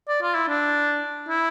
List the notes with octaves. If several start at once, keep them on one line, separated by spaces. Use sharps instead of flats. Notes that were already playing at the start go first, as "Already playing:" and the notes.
D5
F4
E4
D4
E4